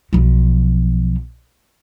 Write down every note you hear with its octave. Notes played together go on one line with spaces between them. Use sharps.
B1 F3